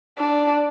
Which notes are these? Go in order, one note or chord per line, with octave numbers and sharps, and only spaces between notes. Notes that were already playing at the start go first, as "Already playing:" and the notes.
D4